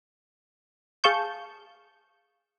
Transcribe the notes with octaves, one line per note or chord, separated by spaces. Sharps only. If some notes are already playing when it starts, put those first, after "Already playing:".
G#4 F5 A5 C#6 G6